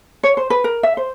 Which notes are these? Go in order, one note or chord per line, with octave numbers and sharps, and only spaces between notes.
C#5
C5
B4
A#4
E5
C5